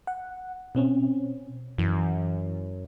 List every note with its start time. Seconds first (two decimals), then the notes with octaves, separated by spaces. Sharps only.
0.07 F#5
0.75 B2 C4 C#4
1.78 F#2 E3